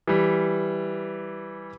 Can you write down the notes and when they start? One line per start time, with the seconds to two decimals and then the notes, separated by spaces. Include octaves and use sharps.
0.07 E3 G3